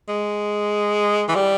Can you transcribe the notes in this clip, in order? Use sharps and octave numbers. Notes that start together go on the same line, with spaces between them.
G#3
E3
G3